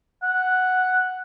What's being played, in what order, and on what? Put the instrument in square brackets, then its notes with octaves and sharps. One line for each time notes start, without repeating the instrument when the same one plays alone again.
[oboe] F#5